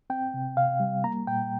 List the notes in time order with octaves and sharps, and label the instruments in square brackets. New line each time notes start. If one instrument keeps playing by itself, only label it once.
[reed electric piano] C4 G5
C3
C3 F5
G3
A#3 A#5
A#2 G5